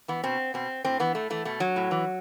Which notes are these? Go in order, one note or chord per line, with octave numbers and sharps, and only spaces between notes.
E3 B3
B2 C4
B2 C4
A2 C4
E3 B3
A2 A3
E3 A3
B2 A3
F#3
A2
E3